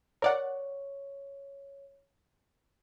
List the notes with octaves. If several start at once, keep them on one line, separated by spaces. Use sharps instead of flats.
A#4 C#5 D5 F#5